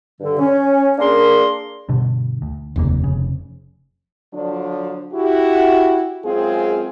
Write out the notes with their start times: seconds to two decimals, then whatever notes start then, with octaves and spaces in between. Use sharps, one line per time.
0.20 G2 D3
0.39 C#4
0.98 A#3 D4 G#4 A#4 C6
1.89 G2 B2 D3
2.42 D2
2.76 F1 D#2 C#3 A#3
3.04 C#3
4.33 D3 F3 F#3 D4
5.13 E4 F#4 G4
6.24 F#2 G#3 C4 F4 G#4